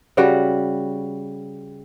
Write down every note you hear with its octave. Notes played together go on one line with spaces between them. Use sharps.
C#3 G3 F#4